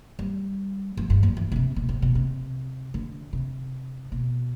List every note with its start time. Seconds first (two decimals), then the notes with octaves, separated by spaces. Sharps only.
0.19 G3
0.97 F3
1.10 G2
1.23 F2
1.37 E3
1.52 B2
1.56 C3
1.76 B2
1.89 A2
2.02 B2
2.15 C3
2.94 D3
3.33 C3
4.12 B2